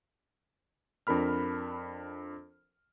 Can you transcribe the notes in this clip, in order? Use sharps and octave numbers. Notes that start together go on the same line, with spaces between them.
F2 D4 A#4 B5 F6